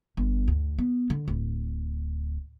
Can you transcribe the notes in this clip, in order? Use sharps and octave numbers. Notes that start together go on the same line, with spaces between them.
G1
D2
B3
D3
D1